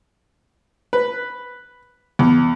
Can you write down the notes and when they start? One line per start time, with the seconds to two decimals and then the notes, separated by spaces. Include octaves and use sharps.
0.93 B4
2.19 E2